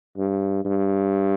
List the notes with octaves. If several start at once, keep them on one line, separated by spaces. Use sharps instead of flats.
G2
G2